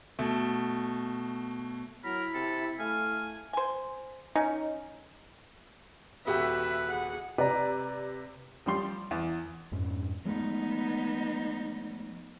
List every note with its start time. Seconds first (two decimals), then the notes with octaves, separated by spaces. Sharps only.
0.19 B2 A3
2.04 F#3 E4 A#4 B5
2.34 C3 A4
2.79 A3 F5 G#5
3.53 C5 G#5
4.36 C#4 D#4
6.27 D#1 F#4 G4 B4 E5
6.87 G#4 F#5
7.38 C3 B4 D5 A#5
8.66 F3 G3 C6
9.11 E2
9.72 F2 G#2 C#4
10.25 F3 G#3 A3 B3 D#4